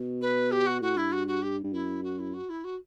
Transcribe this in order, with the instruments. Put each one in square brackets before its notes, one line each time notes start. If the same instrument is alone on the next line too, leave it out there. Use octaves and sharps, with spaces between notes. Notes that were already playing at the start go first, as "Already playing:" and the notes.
Already playing: [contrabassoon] B2
[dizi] B4
G4
F#4
[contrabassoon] A2 [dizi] F#4
[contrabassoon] G2 [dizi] E4
[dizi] F#4
F#4
G4
[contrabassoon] G2
[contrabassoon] F#2 [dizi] E4
[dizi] F#4
E4
F#4
E4
F#4